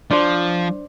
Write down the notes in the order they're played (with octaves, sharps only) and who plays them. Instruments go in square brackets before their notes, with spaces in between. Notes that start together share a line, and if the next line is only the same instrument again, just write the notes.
[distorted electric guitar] F3 [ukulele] D4 C5